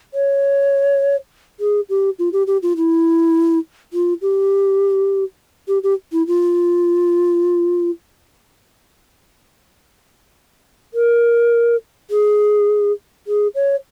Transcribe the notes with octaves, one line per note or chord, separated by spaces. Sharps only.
C#5
G#4
G4
F4
G4
G4
F4
E4
F4
G4
G4
G4
E4
F4
A#4
G#4
G#4
C#5